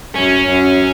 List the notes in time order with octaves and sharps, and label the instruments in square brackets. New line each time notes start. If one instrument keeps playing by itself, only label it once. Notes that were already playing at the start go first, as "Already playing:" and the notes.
[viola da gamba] F#2 [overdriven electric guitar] C#4
[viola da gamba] F#2